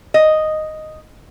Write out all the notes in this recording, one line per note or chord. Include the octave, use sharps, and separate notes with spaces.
D#5